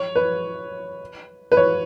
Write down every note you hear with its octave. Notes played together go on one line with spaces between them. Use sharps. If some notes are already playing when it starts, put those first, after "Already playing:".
Already playing: C#5
B4
B4
C#5